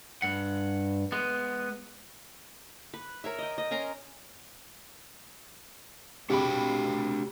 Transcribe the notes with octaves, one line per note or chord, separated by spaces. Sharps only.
G2 F#5
G#3 B3
B4
A#4 C#5 E5
D#5 G5
D#5
C#4 A#4 A#5 C6
C3 G#3 D4 F#4 G4 G5 B5